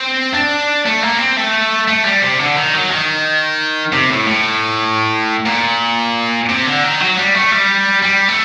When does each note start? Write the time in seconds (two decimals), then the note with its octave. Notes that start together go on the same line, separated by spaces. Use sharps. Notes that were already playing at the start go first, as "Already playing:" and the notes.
Already playing: C4
0.34 D4
0.86 A3
1.02 A#3
1.19 C4
1.36 A3
1.88 A3
2.05 G3
2.22 C3
2.39 D3
2.56 D#3
2.73 F#3
2.90 D#3
3.93 C3
4.10 A2
4.27 A2
5.46 A#2
6.49 C3
6.66 D3
6.83 D#3
7.00 F#3
7.17 G3
7.34 A3
7.52 G3
8.03 G3
8.28 A3